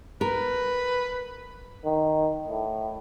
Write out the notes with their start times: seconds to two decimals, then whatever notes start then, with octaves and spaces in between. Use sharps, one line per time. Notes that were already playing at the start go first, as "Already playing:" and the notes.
0.21 A#4 B4
1.85 D#3
2.49 A2